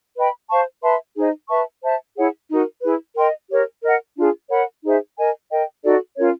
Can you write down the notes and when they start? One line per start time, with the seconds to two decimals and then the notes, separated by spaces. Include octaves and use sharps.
0.16 B4 D#5 G5 B5
0.49 C5 F5 A5 C#6
0.82 B4 E5 A5 C6
1.16 D#4 G#4 C5 D#5
1.49 B4 E5 A5 C#6
1.82 C5 E5 A5
2.16 E4 G#4 C#5 F#5
2.49 D#4 F#4 A#4
2.82 E4 G#4 B4
3.16 A#4 D#5 G5 C6
3.50 G4 A#4 C#5
3.83 A#4 D#5 F#5
4.17 D4 F4 G#4
4.49 A#4 C#5 F#5 B5
4.83 D#4 G#4 C5 E5
5.17 A#4 D#5 G#5
5.50 A#4 D#5 G5
5.83 D#4 F#4 A4 D5
6.16 C#4 F4 A#4 C#5